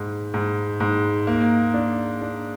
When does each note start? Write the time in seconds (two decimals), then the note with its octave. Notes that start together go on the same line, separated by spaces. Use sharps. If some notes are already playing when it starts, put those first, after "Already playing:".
Already playing: G#2
0.34 G#2
0.80 G#2
1.27 A#3
1.74 D4
2.22 D4